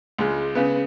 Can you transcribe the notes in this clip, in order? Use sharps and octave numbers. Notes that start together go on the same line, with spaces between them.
C#2 G#3
C#3 B3